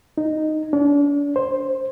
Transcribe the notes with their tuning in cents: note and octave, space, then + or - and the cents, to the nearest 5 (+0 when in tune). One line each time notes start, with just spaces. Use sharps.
D#4 -5
D4 -40
C5 +10